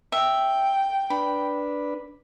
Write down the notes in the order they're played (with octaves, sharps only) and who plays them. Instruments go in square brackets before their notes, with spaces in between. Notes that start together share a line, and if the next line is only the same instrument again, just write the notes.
[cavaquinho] E5 [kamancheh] G5
[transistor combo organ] D4 B4 [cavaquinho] B5